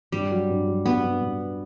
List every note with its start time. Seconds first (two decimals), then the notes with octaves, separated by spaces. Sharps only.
0.12 G2 G3
0.32 F#3
0.50 G2
0.68 F#3
0.85 G2 B3
1.04 G2
1.22 G2